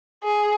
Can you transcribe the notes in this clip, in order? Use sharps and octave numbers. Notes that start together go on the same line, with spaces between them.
G#4